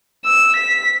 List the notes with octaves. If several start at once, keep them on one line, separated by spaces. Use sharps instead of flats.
E6
B6